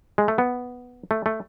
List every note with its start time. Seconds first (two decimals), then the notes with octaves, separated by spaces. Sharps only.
0.18 G#3
0.28 A3
0.38 B3
1.11 A3
1.26 A3